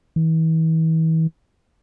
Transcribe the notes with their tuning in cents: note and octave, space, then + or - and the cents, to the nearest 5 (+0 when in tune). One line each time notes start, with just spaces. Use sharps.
E3 -40